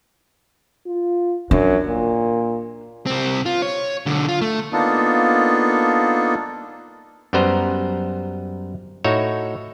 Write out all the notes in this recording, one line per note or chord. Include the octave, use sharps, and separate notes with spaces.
F4
F#2 D4
A#2
C2 C4
F4
C#5
B1 D3
F4
A3
A#3 B3 D4 D#4 F4 A4
F#2 G3 B3 B4 C5 A#5
A2 D#4 F#4 C#5 E5